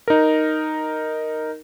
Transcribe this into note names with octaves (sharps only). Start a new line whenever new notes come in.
D#4 A#4